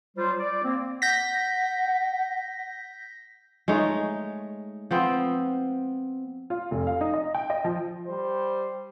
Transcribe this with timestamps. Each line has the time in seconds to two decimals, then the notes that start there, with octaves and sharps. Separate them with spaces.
0.17 F#3 G3 F4 C5
0.40 D5
0.64 A#3 C4
1.02 F#5 G6 A#6 B6
3.68 G#3 A3 D#4 C#5
4.91 F3 B3 C4
6.50 F4
6.71 F1
6.87 F5
7.01 D#4
7.14 D#5
7.35 G5
7.50 D#5
7.64 F3
8.07 G3 C5